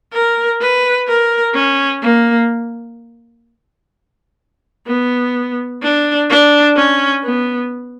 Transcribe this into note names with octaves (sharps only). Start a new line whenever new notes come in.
A#4
B4
A#4
C#4
A#3
B3
D4
D4
C#4
B3